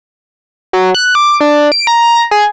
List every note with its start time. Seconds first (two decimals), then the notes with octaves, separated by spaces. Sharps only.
0.73 F#3
0.95 F#6
1.15 D6
1.41 D4
1.72 D7
1.87 A#5
2.31 G#4